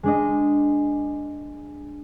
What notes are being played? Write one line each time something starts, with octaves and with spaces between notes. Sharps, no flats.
G#3 D4 D#5